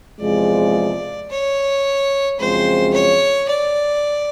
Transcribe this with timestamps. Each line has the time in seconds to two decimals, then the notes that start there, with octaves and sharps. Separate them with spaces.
0.21 E2 C3 F3 G#3 D5
1.30 C#5
2.40 F#2 C#3 F3 G#3 C4 C5
2.94 C#5
3.49 D5